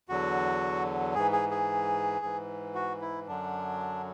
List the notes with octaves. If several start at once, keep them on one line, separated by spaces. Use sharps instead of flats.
E2 D3 F#3 F#4
G#2 E3 G#4
G#4
G#4
G#2 E3
F#4
E4
F#2 D3 F#3 D4